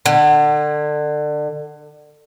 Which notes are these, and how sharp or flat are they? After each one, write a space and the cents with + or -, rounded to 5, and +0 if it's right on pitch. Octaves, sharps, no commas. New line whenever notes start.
D3 +30